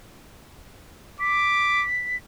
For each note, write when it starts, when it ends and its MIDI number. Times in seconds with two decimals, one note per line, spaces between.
1.20 1.86 86
1.20 2.17 95